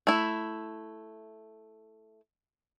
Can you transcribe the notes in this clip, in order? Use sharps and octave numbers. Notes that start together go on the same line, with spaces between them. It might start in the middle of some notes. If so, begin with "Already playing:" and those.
A3 E4